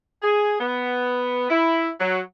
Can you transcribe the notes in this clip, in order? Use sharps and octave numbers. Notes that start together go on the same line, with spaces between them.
G#4
B3
E4
F#3